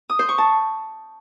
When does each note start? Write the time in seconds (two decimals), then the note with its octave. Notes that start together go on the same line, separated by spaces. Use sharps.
0.10 D#6
0.19 C5
0.29 C#6
0.38 A5